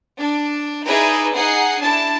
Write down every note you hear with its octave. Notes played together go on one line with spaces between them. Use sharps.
D4
D#4 E4 G#4 B4 D5 E5
D#4 G#4 F#5 C7
D4 E4 A5